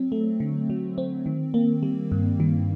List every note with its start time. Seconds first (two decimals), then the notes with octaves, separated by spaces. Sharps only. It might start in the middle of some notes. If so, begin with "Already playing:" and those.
Already playing: F#3 C4
0.12 A3
0.40 D3
0.70 F#3
0.98 C4
1.26 D#3
1.54 A#3
1.83 G3
2.12 G2
2.40 D#3